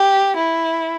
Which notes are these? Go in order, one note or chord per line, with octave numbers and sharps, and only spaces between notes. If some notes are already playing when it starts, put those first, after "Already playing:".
Already playing: G4
E4